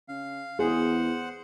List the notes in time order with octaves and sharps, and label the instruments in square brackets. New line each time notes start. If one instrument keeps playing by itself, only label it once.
[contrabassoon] C#3 [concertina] F5
[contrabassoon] E2 [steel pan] G#4 [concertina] C5 F#5